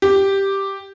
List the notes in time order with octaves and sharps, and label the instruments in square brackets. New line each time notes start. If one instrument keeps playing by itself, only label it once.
[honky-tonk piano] G4